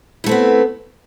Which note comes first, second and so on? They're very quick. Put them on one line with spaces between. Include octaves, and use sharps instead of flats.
E4 A3 C4 B3